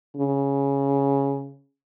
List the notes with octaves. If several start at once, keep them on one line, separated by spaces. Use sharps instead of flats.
C#3